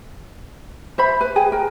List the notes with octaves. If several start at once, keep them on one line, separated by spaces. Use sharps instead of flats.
C5 E5 B5
B4
G#4 G5 G#5
A#4